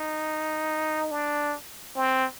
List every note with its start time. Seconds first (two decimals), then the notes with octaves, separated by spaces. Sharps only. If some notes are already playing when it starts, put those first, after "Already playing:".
Already playing: D#4
1.11 D4
1.96 C4